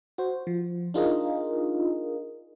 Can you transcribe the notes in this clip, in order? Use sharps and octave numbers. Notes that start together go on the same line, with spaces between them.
F#4 C5
F3
D4 D#4 F4 G#4 A#4 D#5